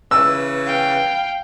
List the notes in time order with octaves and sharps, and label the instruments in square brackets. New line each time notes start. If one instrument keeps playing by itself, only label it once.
[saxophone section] C#3 E3 B4 [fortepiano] E6
[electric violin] F5 G5